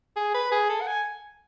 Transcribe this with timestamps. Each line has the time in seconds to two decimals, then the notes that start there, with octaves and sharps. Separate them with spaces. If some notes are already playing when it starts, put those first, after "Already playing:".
0.16 G#4
0.34 B4
0.52 G#4
0.69 A4
0.81 F#5
0.87 G#5